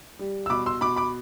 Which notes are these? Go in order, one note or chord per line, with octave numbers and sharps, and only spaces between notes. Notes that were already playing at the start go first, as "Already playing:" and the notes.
G3
E6
B2 B5 D6
C6 E6
B2 B5 D6
B5 D6